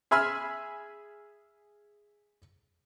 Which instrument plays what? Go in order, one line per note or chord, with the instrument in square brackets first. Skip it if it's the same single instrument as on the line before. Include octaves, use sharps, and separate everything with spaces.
[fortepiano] G#4 E5 G#5 B5 E6 F6